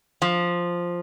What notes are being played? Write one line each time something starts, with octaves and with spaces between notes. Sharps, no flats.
F3